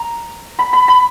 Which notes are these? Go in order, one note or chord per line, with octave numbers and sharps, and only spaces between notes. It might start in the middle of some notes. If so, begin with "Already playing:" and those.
Already playing: A#5
B5
B5
B5